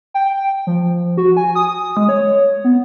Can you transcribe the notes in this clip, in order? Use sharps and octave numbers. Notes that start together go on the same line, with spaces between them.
G5
F3
F#4
G#5
D#6
G#3
C#5
B3